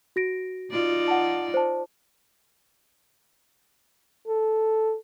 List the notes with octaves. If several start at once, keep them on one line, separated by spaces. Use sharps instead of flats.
F#4 A#6 D7
D#4 F4 D5
F#5 A5
C5 A5
A4